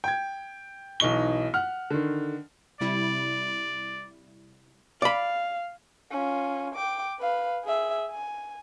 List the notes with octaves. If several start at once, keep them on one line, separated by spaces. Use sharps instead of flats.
G5 G#6
B1 E3 D#4 C#6 G7
F#5 F6
D3 D#3
C3 G3 E4 D5
D5 F5 B5
C#4 F4
G5 D6
B4 F5
G#4 E5
G#5